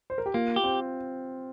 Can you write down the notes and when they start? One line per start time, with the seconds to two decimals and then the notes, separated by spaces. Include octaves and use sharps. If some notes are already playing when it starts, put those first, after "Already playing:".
0.10 C5
0.18 A#4
0.26 G4
0.34 A#3 F4
0.56 G4
0.64 C4